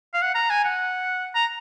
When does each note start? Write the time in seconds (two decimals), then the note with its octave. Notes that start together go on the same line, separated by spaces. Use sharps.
0.14 F5
0.22 F#5
0.35 A#5
0.50 G#5
0.64 F#5
1.35 A#5